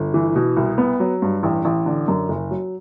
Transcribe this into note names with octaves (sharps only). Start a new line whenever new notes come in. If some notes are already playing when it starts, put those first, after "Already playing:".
Already playing: G1
E3
B2
C2
B3
F#3
G2
A1
A1
D3
F#2
F#1
F#3